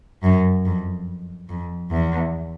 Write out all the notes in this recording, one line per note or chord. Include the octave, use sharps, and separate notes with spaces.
F#2
F2
F2
E2